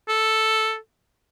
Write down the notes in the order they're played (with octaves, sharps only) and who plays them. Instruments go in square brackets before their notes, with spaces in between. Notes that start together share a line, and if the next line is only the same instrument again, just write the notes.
[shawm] A4